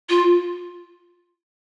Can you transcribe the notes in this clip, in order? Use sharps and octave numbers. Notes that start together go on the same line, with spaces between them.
F4